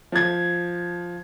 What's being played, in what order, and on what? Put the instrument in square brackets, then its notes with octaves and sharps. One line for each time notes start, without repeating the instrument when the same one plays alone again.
[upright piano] F3 G#6